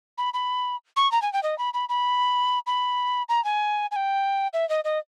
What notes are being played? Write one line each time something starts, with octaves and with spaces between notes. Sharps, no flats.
B5
B5
C#6
A#5
G#5
G5
D#5
B5
B5
B5
B5
A#5
G#5
G#5
G5
E5
D#5
D#5